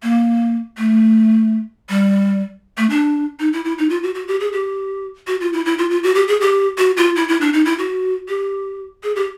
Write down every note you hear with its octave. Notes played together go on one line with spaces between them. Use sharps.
A#3
A3
G3
A3
D4
D#4
E4
E4
D#4
F4
F#4
F#4
G4
G#4
G4
F#4
F4
E4
E4
F4
F4
F#4
G4
G#4
G4
F#4
F4
E4
E4
D4
D#4
E4
F#4
G4
G#4
G4